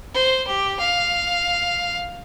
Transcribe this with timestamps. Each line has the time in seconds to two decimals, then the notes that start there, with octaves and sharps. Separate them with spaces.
0.14 C5
0.48 G4
0.80 F5